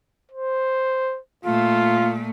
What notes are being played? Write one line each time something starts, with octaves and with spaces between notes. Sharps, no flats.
C5
A#2 A3 F4